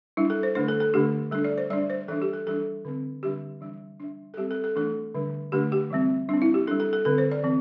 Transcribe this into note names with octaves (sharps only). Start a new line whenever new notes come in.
G3 D4 E4
A4
C5
D3 A3 D4 C5
A4
A4
D3 A3 D4 G4
G3 D4 A4
D5
C5
G3 D4 D5
C5
E3 G3 D4 A4
G4
A4
E3 G3 D4 A4
D3 C4
D3 G3 D4 G4
E3 G3 D4
G3 D4
A4
G3 C4 G4
A4
A4
E3 A3 D4 A4
D3 G3 D4
D3 A3 D4 G4
G4
E3 G3 C4
G3 C4 D4
E4
G4
G3 D4 A4
A4
A4
D3 C4 A4
C5
D5
E3 C4